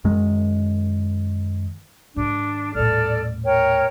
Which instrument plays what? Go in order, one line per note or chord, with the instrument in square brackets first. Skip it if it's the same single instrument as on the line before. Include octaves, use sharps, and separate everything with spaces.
[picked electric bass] F#2 D#3 G#3
[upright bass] G#2 D#3 [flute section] D4
[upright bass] D#1 A2 [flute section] A4 D5 F6
[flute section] A#4 C#5 G5